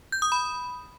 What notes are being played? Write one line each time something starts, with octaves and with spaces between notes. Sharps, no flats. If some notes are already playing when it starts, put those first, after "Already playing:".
G6
D#6
B5